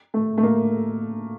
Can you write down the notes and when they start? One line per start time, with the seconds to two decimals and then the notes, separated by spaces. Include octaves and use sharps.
0.14 A3
0.38 A3
0.43 A#3